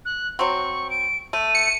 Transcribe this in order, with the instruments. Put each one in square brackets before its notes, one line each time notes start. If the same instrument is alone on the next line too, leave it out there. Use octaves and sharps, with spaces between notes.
[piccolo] F#6
[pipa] F#3 C4 [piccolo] C#6
[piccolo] D7
[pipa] A3 [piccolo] D#7
[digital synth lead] C#7